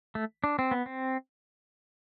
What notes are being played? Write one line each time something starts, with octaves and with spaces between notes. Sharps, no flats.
A3
D4
C4
B3
C4